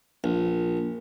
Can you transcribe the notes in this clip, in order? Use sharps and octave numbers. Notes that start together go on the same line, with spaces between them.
A#1